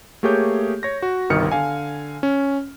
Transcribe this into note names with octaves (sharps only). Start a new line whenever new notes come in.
A3 A#3 G4 G#4 C#5 G6
C#5 A#6
F#4
G1 C2 D#3 D#6 F6 C#7
D3 F5 G#5
C#4